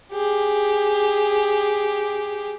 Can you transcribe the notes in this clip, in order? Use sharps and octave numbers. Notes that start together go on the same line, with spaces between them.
G4 G#4